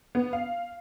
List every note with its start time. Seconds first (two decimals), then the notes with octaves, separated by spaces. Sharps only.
0.15 B3
0.33 F5